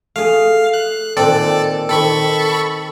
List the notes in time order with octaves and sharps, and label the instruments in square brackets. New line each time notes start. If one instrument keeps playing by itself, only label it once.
[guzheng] A3 G#4 [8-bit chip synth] F5
[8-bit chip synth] F#6
[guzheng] A#2 D#3 C4 [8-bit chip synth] A4 D5
[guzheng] D#3 C4 [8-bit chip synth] A4 B5 C#6